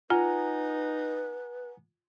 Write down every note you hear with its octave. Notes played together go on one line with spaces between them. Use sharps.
D#4 F4 B4 F#5 G#5 A#5